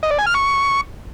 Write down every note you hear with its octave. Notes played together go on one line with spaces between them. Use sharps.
D#5
D5
G#5
F6
C#6